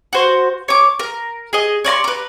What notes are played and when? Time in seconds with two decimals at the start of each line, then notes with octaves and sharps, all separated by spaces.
0.13 F#4 C5
0.68 C#5 D6
0.99 A#4
1.53 G#4 D#5
1.84 C#5 D5 A#5 C6
2.04 A#4 B4